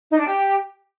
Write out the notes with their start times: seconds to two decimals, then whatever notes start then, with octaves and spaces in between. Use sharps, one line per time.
0.10 D#4
0.19 D4
0.28 G4